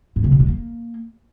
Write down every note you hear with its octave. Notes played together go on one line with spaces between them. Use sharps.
G#2
C#3
B2
G#3
A#3